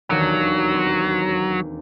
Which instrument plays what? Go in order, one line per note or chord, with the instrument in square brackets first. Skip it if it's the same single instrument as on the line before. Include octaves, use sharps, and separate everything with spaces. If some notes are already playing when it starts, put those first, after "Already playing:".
[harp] E1 D#2 D4 [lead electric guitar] F#3
[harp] C4